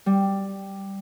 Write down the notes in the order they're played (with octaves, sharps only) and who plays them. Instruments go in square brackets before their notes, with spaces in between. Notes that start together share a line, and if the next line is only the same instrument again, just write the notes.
[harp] G3